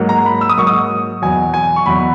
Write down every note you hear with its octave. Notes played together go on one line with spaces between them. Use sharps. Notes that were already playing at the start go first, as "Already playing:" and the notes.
Already playing: G#2 F#3 A#3
A#5
B5
E6
D#6
G#2 F#3 A#3 C#6
D#6
E2 B2 F#3 G#5
G#5
C#6
E2 B2 F#3 B5
B5